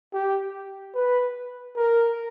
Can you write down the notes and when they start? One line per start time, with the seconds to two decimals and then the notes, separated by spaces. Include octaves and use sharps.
0.13 G4
0.95 B4
1.76 A#4